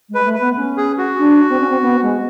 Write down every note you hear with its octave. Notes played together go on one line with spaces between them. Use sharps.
G#3 B4
A3
B4
B3
C#4
G#4
F#4
D4
C4
C#4
C4
B3
G#3